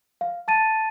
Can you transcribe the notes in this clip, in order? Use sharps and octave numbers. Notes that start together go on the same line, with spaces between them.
F5
A5 A6 D#7